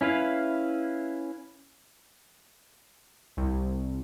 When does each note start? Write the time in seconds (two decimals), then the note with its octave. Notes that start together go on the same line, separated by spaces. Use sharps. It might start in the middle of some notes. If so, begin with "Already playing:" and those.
0.01 C#4 E4 B4 F5
3.37 C2